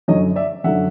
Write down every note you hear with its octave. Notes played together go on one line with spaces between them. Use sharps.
F#2 D3 F#3 C#5 D#5
D5 E5
F#2 D3 F#3 E5 F#5